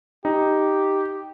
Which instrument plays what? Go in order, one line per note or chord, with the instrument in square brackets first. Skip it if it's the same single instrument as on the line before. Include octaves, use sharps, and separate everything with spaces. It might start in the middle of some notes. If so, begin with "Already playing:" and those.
[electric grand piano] D#4 [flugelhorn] G4